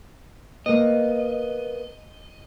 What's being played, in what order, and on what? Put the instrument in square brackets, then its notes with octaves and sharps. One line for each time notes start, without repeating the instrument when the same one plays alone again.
[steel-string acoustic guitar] A#3 B3 [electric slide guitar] D#5